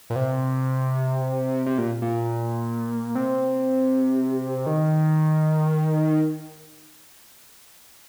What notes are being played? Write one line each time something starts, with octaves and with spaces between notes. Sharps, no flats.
A#2
C3
C3
A#2
A#2
C3
D#3